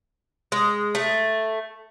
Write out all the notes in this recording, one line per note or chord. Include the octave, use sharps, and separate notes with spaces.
G#3
A3